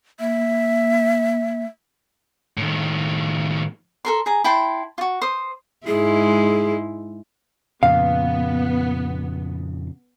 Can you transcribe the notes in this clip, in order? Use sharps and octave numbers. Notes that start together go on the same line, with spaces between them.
A#3 E5
A2 D#3
A4 A#4 C6
G#4 A#5
E4 G5 A5 C6
F4 F#4
C5 D#6
G#2 G#3 E4 G#4
F2 A#2 C#3 B3 F5